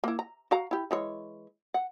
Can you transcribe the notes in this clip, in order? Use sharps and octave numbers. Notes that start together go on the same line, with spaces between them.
A#3 E4
A#5
F#4 F5 A#5
E4 G4
E3 G#3 C#5
F#5